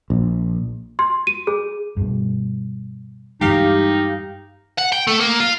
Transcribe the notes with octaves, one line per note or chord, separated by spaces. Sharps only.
A#1
C6
D#7
G#4
G2 B2
G2 E3 G#3 D#4 G4 F5
F#5
G5
A3
A#3
F4